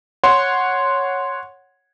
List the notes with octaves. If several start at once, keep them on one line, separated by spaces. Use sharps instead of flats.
C#5 F#5 C6